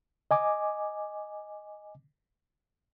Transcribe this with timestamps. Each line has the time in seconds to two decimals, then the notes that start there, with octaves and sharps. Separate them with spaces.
0.31 D#5 G#5 D6